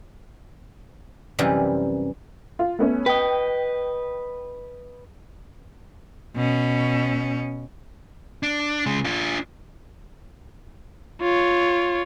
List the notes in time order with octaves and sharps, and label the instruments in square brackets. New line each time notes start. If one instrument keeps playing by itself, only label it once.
[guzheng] F#2 C3 E3 G3
[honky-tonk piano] F4
A3 B3 C#4
[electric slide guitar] B4 D#5 [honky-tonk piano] G5
[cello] B2 C#4
[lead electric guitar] D4
C#3 G#3
D4 F4
[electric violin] F4 C#5